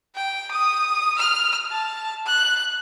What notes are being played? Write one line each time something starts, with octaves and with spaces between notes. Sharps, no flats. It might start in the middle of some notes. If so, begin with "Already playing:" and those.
G5
D#6
F6
A5
F#6